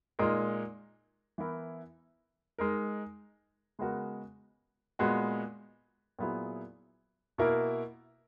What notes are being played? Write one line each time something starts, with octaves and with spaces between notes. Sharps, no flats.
A#2 G#3 D#4 A#4
E3 B3 E4 A#4
G#3 D#4 A#4
C#3 G#3 B3 F#4 A#4
A#2 G#3 B3 F#4
A#2 F#3 B3 E4 G#4
B2 A#3 E4 A#4